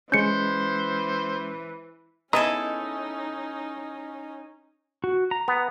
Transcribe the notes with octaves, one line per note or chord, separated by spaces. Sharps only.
E3 G#3 C#4 C5 G6 C#7
B3 C#4 D#4 E4 G#4 A4 D#5 A#5
F#4
A#5
B3